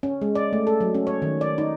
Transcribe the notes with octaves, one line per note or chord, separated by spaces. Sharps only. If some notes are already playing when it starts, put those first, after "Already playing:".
C#4
G#3
D5
A3
A4
F#3
C#4
C#5
D#3
D5
D#4